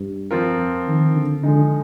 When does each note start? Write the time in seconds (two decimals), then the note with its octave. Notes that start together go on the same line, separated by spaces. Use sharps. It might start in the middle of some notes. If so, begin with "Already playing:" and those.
Already playing: G2
0.31 F3 C4 F4 A#4
0.58 F2
0.87 D#3
1.14 D3
1.43 D3 F3 G#3 D#4